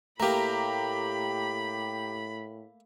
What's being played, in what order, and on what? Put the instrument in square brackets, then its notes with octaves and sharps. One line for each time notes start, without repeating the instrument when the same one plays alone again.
[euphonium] A2 [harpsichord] A3 A#3 [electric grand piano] G4 A#5 [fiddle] B5